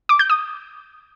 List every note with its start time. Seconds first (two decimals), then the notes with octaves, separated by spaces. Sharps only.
0.09 D6
0.19 G6
0.30 D#6